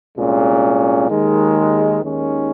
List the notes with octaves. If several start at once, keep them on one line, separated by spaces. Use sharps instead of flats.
C2 A#2 G#3 C#4
D#2 D#3 G#3
D#2 D#3 G#3 C#4